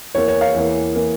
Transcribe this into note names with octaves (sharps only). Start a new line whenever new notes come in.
E2 E3 A#3 C#5
C#5
C#5 F5
E2 E3 A#3
E3 A#3